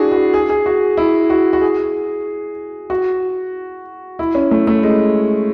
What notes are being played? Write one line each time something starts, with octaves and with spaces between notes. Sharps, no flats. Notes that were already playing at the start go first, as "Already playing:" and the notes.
Already playing: D4 E4 F#4 G#4
F#4
G#4
G#4
F#4
E4
F#4
F#4
G#4
F#4
E4
C#4
A3
A3
G#3